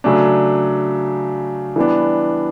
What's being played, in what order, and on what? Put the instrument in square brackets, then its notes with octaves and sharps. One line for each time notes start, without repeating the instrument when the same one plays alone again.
[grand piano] C#3 F#3 A3 D4
E3 G3 B3 D4